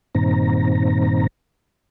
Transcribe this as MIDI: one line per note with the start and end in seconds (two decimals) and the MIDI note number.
0.15 1.27 43
0.15 1.27 46
0.15 1.27 51
0.15 1.27 60
0.15 1.27 82